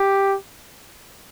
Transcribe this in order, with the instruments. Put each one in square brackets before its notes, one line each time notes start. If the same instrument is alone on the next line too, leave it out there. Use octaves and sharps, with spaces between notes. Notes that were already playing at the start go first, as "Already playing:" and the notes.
Already playing: [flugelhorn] G4